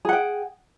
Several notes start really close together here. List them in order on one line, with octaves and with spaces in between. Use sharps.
G#4 F#5 G5